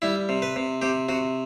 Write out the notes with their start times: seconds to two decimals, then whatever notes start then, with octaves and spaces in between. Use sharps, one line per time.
0.02 G3 E4
0.29 C3
0.42 B4
0.56 C3
0.82 C3 G4
1.09 C3 F#4